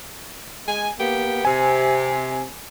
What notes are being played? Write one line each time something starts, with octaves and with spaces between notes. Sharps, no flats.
G#3 G#5
A#3 B3 G4
C3 G#5